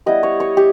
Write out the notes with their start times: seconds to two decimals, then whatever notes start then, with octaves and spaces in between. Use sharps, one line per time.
0.06 G3 B3 E4 D#5
0.23 C#5
0.40 C#5
0.57 G4